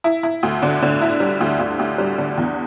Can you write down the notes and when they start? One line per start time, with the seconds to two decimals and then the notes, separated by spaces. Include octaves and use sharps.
0.04 E4
0.23 E4
0.43 D2
0.62 D3
0.82 D3
1.01 E4
1.20 G3
1.41 D2
1.59 D2
1.79 D2
1.98 G3
2.18 D3
2.38 E2